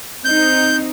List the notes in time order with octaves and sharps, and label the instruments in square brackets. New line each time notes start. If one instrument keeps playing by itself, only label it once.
[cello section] C4 D#4 [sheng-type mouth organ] G6